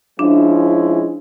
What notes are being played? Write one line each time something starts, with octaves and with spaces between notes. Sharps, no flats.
F3 G#3 C#4 D4 E4